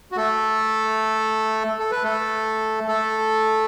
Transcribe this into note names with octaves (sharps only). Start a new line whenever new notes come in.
F#4
A3 A4
A4
B4
A3 A4
A3 A4